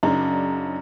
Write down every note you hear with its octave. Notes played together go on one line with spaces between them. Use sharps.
F#2 C#3 D4 D#4